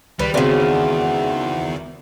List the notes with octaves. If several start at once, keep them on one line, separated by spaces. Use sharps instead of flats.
C#2 D#3 G3 B4
E2 C#3 C4 F#4 D5 G#5